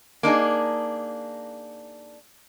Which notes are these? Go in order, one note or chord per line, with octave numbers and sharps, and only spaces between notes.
A#3 D4 D#4 G#4